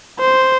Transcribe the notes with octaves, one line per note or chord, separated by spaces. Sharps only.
C5